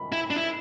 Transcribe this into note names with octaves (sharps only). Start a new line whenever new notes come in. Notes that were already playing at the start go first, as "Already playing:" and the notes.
Already playing: B5
E4
D4
E4